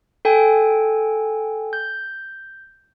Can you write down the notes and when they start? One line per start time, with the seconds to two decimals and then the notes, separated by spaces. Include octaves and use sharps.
0.25 A4 G5 G#5
1.73 G6